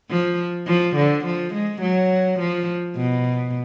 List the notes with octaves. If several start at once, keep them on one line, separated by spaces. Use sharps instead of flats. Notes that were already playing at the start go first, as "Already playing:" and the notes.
F3
F3
D3
F3
G#3
F#3
F3
B2